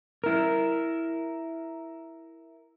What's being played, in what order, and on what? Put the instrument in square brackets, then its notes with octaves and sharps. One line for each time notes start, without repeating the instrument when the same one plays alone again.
[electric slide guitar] E4 A#4